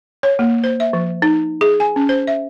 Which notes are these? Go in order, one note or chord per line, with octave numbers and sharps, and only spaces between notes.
C#5
A#3
C5
E5
F3
D#4
G#4
G#5
C#4
C5
E5